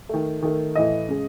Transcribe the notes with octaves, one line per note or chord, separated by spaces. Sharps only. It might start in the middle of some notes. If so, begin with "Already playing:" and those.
D#3 A3
D#3 A3
A2 E3 A3 D#5
C#3 G#3